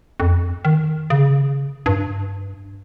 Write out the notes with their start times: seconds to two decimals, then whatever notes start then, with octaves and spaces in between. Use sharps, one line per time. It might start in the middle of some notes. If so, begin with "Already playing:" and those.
0.20 F2
0.65 D#3
1.10 C#3
1.86 G2